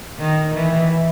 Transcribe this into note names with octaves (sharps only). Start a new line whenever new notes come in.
D#3
E3